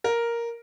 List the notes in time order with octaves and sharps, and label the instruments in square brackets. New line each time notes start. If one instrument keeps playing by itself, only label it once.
[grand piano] A#4